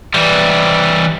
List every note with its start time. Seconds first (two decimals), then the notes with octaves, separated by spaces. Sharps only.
0.14 E3 G3